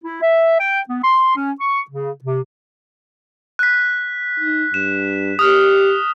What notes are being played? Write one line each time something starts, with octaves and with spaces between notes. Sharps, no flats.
E4
E5
G5
B3
C6
C#4
C#6
C#3
C3
F#6 B6
D#4
G2 E7
G4 D#6 F6